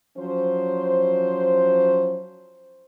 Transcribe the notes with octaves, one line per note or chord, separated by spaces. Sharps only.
F3 F#3 C#4 C5